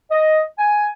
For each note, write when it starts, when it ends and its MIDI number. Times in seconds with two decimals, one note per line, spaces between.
0.11 0.41 75
0.59 0.88 80